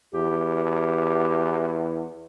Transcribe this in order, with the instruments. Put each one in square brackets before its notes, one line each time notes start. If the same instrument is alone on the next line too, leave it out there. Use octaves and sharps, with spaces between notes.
[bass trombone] E2 [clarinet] G4